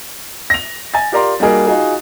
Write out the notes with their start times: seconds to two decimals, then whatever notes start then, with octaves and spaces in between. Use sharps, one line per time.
0.50 A#6 F7
0.94 G#5 A6
1.12 F4 G4 A#4 D5 A#5 C6
1.40 G3 A#3 D#4 F#4 G#4 A#4
1.67 D#4 F4 F#4 G#4